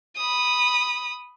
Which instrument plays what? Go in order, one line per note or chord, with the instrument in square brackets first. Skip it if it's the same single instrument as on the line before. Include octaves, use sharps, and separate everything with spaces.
[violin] B5 D#6